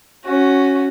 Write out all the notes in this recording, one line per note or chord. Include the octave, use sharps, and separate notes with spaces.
C#4 F#4